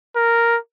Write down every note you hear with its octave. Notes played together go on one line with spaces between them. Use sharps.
A#4